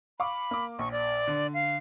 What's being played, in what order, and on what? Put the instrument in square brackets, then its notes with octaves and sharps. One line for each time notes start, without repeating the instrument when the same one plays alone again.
[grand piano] F5 C#6 D6 [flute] B5
[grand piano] A#3 D6
[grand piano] A#1 [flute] C#6
[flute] D5
[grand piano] D3
[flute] F5